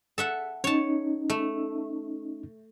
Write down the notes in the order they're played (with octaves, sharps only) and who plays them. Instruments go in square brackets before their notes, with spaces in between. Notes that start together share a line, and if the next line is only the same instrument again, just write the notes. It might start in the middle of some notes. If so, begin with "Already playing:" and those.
[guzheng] A4 E5 F#5
[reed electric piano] C#4 D#4 [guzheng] C#5 A5
[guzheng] A3